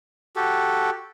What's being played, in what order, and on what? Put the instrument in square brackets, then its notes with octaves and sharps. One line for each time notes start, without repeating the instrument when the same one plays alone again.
[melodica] F#4 G4 A4